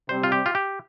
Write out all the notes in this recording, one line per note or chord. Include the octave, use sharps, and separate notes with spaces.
C3 G3 C4 C5
F4
G4
F4
G4